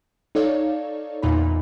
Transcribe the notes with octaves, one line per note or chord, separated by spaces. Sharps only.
D#4 A4 C#5 D5 F5
E2 A#2 D#4 B5